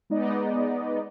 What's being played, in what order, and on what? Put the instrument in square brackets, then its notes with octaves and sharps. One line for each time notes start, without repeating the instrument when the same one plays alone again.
[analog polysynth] G#3 B3 D#4 D5 D#5